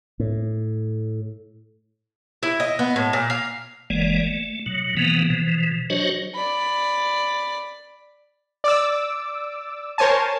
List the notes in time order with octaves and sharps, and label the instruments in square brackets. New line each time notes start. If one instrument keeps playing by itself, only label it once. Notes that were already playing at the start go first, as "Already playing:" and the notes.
[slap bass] A2
[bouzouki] E4
D#5
B3
A2
A#2
F5
[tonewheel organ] F#1 E3 G#3 A#3 D5
A3
B2 F#3
B2 E3 F3 A#3 B3
B2 E3 F3
F#3 D4 F#4 C5 C#5 D#5
[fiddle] D5 B5
[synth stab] D5 D6 E6
A#4 C5 C#5 G#5 A5